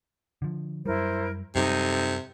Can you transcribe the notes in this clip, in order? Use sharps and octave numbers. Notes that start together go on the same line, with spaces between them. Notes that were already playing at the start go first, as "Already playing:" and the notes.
D3 F3
F#2 G3 E4 A#4 C5
F#2 C3 G3 D#4 A4